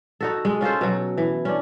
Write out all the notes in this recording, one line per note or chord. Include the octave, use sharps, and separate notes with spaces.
D#4 F#4 A4
G#3
C#4 F4 A4 C5
B2 F#3
E3
C#4 D4